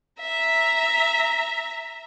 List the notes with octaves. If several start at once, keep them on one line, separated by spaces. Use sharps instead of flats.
E5 A#5